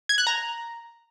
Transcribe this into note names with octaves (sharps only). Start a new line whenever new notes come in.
G#6
F#6
A#5